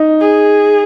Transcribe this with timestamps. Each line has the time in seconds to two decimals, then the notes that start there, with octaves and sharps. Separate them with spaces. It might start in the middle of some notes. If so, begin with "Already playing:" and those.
Already playing: D#4
0.20 G#4